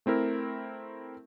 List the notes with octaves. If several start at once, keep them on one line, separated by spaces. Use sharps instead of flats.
A3 C4 E4 A#4